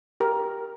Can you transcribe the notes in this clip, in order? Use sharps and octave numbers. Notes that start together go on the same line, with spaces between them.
G4 A#4